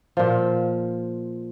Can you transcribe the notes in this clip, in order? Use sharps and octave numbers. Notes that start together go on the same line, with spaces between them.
A#2 F3